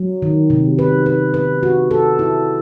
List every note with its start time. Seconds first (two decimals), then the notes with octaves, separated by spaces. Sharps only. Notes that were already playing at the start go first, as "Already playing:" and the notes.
Already playing: F#3
0.22 D#3
0.50 C3
0.79 B4
1.06 B4
1.34 B4
1.63 F#4
1.91 A4
2.19 E4